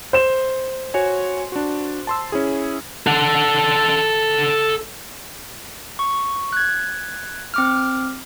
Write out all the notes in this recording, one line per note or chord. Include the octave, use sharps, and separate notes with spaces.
C5 E7
F#4 C#5 G#5
D4 F#4
A5 C6 E6
C#4 E4 G#4
A4 F#5
C#6
F#6 G#6
C4 D6 F6